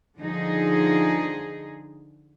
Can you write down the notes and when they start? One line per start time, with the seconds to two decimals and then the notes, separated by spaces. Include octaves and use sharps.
0.19 D3 F3 D#4 G#4